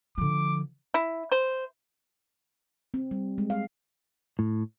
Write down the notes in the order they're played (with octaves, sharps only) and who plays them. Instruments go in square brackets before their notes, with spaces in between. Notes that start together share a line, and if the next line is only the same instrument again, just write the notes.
[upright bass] D3 F3 [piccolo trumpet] D6
[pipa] E4
C5
[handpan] C4
G3
G#3
F5
[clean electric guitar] A2